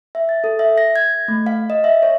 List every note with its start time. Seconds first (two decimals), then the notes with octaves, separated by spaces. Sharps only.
0.15 E5
0.29 A6
0.44 A4
0.59 E5
0.78 A#6
0.96 G#6
1.28 A3
1.46 F5
1.70 D#5
1.84 E5
2.03 C#5